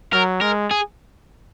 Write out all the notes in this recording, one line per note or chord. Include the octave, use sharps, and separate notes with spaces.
F#3 A#4
G#3 A#4
G#4